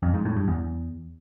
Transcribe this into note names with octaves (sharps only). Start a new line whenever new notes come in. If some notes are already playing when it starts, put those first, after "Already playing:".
F2
G#2
A2
G2
E2